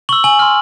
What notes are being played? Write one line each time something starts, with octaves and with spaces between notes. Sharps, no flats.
C#6 E6 F#7
G#5 F#7
C6 F6